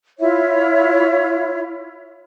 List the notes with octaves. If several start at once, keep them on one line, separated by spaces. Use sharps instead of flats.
E4 F4 C#5 E5